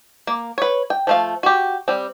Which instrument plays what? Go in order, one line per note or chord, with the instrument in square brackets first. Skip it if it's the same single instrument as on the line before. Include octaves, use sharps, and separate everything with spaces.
[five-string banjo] A#3
B4 C#5
G5
F3 A3 F5
F#4 G4
G3 C4